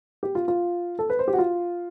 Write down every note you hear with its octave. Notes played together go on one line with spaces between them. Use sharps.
G4
F4
F4
A4
B4
C5
G4
F#4
F4